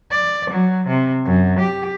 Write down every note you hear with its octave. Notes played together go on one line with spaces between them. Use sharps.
D5
F#3
C3
F#2
G4